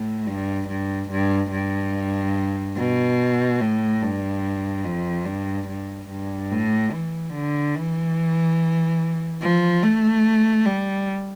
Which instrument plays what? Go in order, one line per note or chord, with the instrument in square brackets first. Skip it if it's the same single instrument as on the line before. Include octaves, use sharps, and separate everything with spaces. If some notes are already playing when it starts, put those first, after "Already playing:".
Already playing: [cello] A2
G2
G2
G2
G2
B2
A2
G2
F2
G2
G2
G2
A2
E3
D3
E3
F3
A3
G3